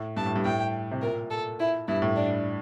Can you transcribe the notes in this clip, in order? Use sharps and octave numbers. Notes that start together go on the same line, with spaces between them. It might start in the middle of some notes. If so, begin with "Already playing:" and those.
Already playing: A2
G2 A5
A2
G2
A2 G5
C3
A#2 A#4
A4
E4
G2 E4
A2
D4